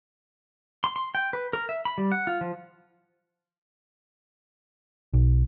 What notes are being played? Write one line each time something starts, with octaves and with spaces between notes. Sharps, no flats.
C6
C6
G5
B4
A#4
E5
B5
G3
F#5
F4
F3
B1